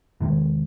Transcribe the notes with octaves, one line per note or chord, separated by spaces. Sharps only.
E2 C3 D#3 G#3